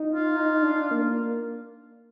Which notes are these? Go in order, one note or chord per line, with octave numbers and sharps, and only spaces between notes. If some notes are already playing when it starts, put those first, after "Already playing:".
Already playing: D#4
F4
D#4
D4
A#3